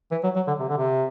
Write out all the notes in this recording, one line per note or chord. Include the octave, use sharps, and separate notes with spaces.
E3
F#3
F#3
D3
C3
D3
C3